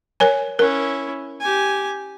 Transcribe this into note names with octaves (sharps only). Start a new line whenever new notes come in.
A#4 C#5 G#5
C#4 E4 A#4
G4 G#5